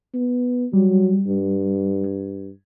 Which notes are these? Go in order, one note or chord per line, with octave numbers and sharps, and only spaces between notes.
B3
F#3 G3
G2